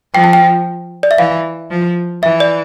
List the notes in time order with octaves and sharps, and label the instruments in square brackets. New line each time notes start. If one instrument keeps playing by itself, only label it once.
[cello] F3 [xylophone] G5
[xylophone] A5
G5
D5
E5
[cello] E3 [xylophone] F5
[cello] F3
[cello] E3 [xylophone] E5
[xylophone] D5